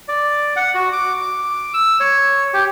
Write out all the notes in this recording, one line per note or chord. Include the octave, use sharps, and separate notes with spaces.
D5
F#5
F#4
D6
D6
E6
C#5
G4